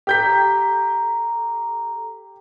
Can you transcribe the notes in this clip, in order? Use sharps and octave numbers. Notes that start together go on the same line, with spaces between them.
G4 A4 A#5 G6 B6